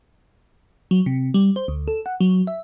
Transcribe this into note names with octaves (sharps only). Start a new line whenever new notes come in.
F#3
C3
G3
C5
D2
A4
F#5
F#3
E5